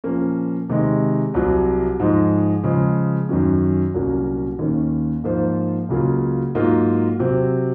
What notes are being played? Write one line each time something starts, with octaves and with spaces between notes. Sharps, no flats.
A#2 F3 A#3 C#4
C3 D#3 G#3
C2 C3 F#3
G#2 F3 G#3
C#3 F3 G#3
F#2 D#3 F#3 C#4
C2 A#2 F#3 A#3 C#4
D#2 D#3 A#3 C#4
G#2 F3 A#3 F4 C5
C#2 C#3 F#3 A#3 F4
G#2 F#3 A#3 F4
C3 F#3 C4